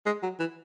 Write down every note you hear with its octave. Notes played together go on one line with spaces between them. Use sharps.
G#3
F#3
E3